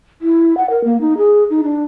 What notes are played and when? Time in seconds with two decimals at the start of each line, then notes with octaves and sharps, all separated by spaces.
0.22 E4
0.57 F#5
0.70 A#4
0.84 A#3
1.01 D#4
1.17 G#4
1.50 D#4
1.64 D4